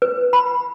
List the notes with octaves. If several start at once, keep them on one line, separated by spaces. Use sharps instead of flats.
B4
B5